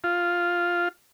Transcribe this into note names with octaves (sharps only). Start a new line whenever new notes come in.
F4